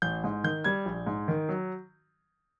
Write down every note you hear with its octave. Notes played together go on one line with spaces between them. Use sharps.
A1 G6
G#2
D#3 G6
G3 G#6
A#1
G#2
D#3
F#3